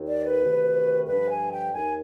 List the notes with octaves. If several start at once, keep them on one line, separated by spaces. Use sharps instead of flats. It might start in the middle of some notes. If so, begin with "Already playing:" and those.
Already playing: D#2 D#3
D5
B4
D2 C3 D#3
G2 D3 F3 B4
G#5
G5
D#2 D#3 G#5